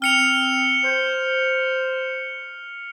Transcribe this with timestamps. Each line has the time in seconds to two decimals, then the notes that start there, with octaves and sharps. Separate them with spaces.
0.02 C4 F6 C#7 F7
0.84 C5